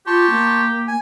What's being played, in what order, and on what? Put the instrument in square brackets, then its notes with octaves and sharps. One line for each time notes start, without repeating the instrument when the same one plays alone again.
[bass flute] F4 [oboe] G4 [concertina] A5 C6 C#6
[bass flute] A#3
[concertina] G#5